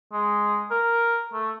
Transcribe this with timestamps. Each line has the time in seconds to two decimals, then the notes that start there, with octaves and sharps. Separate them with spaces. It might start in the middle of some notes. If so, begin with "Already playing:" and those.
0.13 G#3
0.71 A#4
1.33 A3